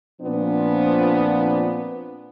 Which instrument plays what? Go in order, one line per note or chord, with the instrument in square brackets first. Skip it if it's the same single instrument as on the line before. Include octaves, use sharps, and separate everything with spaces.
[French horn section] A#2 F3 B3 C4 D4